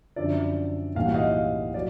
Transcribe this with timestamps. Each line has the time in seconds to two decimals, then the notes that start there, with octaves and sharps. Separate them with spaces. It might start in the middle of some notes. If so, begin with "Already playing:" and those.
0.16 F#2 D3 F3 D5 E5
0.95 B1 A2 E3 G3 A#3 F5
1.06 F#5
1.14 D#5 F5
1.74 F#3 D5